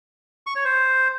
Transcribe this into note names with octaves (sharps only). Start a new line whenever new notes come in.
C#6
C#5
C5